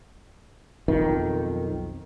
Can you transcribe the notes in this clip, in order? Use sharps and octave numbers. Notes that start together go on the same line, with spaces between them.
B1 F2 D#3